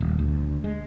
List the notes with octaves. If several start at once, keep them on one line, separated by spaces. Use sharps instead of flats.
D#1
D2
G#3